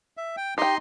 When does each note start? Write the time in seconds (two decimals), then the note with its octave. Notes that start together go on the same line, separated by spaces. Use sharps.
0.17 E5
0.37 G5
0.58 D#4 G4 D#5 G5 C6